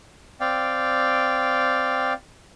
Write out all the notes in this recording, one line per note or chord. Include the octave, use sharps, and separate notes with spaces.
C4 D5 F5 G5